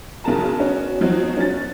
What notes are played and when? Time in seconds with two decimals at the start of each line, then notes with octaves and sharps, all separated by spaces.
0.24 B1 C#3 F#4 A#4 A5 A#5
0.58 B3 C#4 F#4
1.01 F3 F#3 C4 D#4 F#4
1.37 C#4 A6